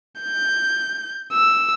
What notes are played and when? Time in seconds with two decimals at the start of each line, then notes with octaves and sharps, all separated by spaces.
0.22 G6
1.33 E6